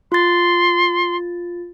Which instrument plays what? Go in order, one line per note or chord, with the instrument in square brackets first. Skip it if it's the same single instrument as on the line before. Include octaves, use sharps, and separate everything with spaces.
[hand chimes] F4 A6 [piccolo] C6